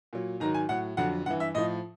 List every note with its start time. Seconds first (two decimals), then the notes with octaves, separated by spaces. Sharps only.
0.13 A#2 F#3
0.40 G#2 D#3 F#3 A#5
0.54 G#5
0.69 A2 F#3 F#5
0.97 F2 D3 F#3 F#5
1.26 G2 E3 F#5
1.40 E5
1.54 A2 F3 D#5